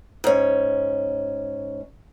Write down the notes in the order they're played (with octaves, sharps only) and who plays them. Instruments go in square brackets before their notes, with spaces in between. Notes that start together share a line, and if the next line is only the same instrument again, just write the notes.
[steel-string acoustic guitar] G#2 C#4